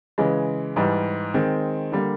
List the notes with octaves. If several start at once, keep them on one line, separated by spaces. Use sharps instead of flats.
C#3 E3 G#3
G#2 E3 G3
D#3 G#3 C4
D3 G3 A#3